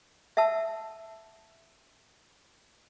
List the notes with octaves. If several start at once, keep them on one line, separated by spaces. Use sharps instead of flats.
E5 F#5 A5 E6